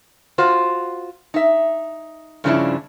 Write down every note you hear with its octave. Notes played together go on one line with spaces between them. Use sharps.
F4 F#4 C5
D#4 E5
G2 C#3 F3 C#4 D4 E4